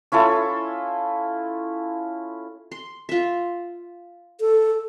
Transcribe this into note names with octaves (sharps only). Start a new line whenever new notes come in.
C#4 E4 F4 A4
C6
F4 E5
A4